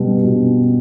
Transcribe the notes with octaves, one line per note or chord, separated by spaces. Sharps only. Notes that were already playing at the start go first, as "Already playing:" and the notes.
Already playing: B2 G3 B3
B2